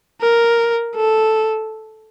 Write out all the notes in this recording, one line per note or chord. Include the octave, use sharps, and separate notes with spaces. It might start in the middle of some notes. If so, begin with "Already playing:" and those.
A#4
A4